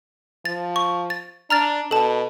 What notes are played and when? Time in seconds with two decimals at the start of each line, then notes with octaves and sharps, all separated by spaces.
0.45 F3 A6
0.76 C#6
1.10 A6
1.50 D4 A#5 F6 A6
1.91 B2 A4 A5